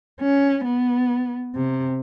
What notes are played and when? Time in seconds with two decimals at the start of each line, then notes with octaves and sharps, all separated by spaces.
0.21 C#4
0.65 B3
1.55 C3